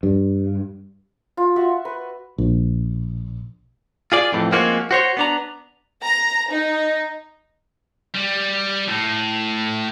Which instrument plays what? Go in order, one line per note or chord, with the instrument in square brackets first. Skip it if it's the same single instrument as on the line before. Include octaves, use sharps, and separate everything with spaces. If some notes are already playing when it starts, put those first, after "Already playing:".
[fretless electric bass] G2
[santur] F4
F#4 E5 F#5
B4
[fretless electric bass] A#1
[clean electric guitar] F4 G#4 D5
F2 A2 E3
F3 G#3 A#3 C4 C#4 F#4
F#4 C5 C#5
B3 D4 A#5
[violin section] A#5
D#4
[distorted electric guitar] G3
A2